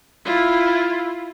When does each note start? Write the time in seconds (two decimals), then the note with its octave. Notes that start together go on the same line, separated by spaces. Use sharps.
0.25 E4 F4